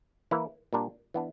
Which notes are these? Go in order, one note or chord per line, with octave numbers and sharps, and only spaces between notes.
E3 A#3 E4
A#2 G3 A#3 D4
E3 B3 D4